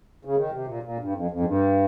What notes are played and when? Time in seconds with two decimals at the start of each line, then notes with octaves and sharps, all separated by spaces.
0.25 C#3
0.37 D#3
0.52 C3
0.67 A#2
0.83 A#2
0.99 G2
1.15 F2
1.31 F2
1.40 G#2
1.45 G2